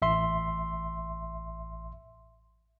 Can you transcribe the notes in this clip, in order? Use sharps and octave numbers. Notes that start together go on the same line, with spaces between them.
A1 E5 C6